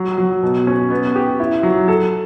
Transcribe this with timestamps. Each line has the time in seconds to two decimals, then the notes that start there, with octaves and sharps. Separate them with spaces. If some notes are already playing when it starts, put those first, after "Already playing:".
Already playing: F#3
0.18 F#3
0.43 B2
0.67 C#4
0.90 B3
1.15 G4
1.40 E4
1.63 F#3
1.88 A4